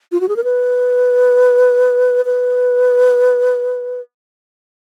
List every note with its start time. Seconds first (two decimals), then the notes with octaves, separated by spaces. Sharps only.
0.12 F4
0.21 F#4
0.29 G#4
0.36 A#4
0.44 B4
2.25 B4